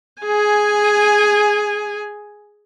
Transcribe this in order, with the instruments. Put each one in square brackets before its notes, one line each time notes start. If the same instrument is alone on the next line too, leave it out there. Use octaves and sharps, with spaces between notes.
[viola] G#4 G#5